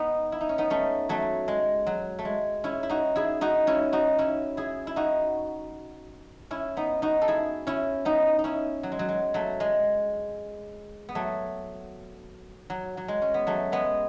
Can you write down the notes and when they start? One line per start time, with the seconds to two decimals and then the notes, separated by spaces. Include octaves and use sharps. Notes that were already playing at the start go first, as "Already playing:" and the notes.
Already playing: B3 D#4
0.32 E4
0.41 D#4
0.49 C#4
0.58 B3 D#4
0.70 A3 C#4
1.09 F#3 A3
1.48 G#3
1.87 F#3
2.19 A3
2.25 G#3
2.64 C#4 E4
2.83 E4
2.89 D#4 F#4
3.16 E4 G#4
3.41 D#4 F#4
3.67 C#4 E4
3.93 D#4 F#4
4.18 C#4 E4
4.57 E4 G#4
4.87 E4
4.96 D#4 F#4
6.51 C#4 E4
6.77 B3 D#4
7.02 D#4 F#4
7.22 A4
7.28 E4 G#4
7.67 C#4 E4
8.05 B3 D#4
8.39 D#4
8.44 C#4 E4
8.83 F#3
8.92 G#3
8.99 F#3
9.09 G#3
9.34 F#3 A3
9.60 G#3
11.09 B3
11.15 F#3 A3
12.70 F#3
12.97 F#3
13.08 G#3
13.22 C#4
13.34 B3
13.47 F#3 A3
13.72 G#3 B3